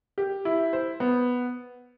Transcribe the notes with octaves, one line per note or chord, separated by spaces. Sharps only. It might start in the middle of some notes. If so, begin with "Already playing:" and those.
G4
E4
C5
B3